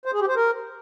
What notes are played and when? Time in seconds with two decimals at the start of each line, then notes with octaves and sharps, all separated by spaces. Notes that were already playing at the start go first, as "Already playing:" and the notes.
0.05 C5
0.13 G#4
0.21 G4
0.28 C5
0.36 A#4